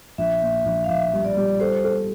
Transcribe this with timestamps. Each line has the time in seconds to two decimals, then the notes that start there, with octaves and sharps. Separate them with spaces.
0.18 A#1 E5
0.42 A#2
0.66 A#1
0.84 F5
0.89 A#1 E5
1.13 G3
1.25 D5
1.37 G3
1.60 A4 C5
1.84 A4